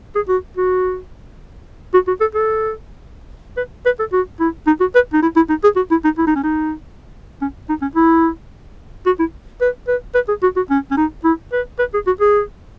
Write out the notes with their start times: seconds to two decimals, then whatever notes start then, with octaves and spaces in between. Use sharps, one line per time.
0.15 G#4
0.29 F#4
0.57 F#4
1.94 F#4
2.08 F#4
2.21 A4
2.35 A4
3.57 B4
3.86 B4
3.99 A4
4.13 F#4
4.40 E4
4.67 D#4
4.80 F#4
4.95 B4
5.13 D#4
5.22 E4
5.36 E4
5.49 D#4
5.64 G#4
5.76 F#4
5.91 E4
6.04 D#4
6.18 E4
6.27 D#4
6.36 C#4
6.44 D#4
7.42 C#4
7.69 D#4
7.82 C#4
7.95 E4
9.06 F#4
9.19 E4
9.61 B4
9.88 B4
10.15 B4
10.28 G#4
10.43 F#4
10.56 F#4
10.70 C#4
10.91 C#4
10.97 D#4
11.24 E4
11.53 B4
11.79 B4
11.94 G#4
12.07 F#4
12.20 G#4